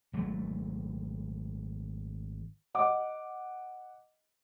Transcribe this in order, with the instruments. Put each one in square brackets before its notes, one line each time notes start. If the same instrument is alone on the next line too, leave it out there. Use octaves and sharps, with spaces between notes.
[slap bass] G#1 F#3 A3
[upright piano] D#5 F#5 D6